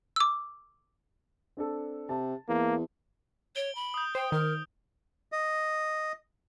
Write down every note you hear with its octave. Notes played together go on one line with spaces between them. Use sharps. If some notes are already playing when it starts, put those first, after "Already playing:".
D6 E6
C4 D4 A4
C3 A5
E2 A#3
C#5 D7 G7
B5
D#6 G6
C5 G5
D#3 A#4
D#5